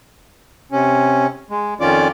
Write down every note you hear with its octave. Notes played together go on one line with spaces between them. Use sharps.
C3 C#4
G#3
F2 D#3 C#4 F4 D5 D6